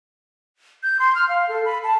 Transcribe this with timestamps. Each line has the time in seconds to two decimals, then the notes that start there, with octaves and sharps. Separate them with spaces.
0.83 G6
1.00 C6
1.15 F6
1.29 F5
1.49 A4
1.65 B5
1.84 A5